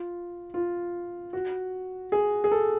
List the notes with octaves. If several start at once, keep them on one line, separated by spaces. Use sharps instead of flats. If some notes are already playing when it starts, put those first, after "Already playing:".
Already playing: F4
F4
F#4
G#4
G#4
A4